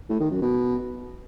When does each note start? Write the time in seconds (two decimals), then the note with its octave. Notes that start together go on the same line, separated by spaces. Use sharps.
0.09 A2
0.20 D#3
0.31 F#2
0.41 B2